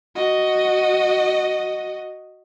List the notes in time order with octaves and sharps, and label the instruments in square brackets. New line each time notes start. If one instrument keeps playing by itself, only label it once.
[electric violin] F#4 D#5